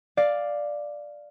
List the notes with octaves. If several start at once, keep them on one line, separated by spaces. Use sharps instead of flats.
D5 F5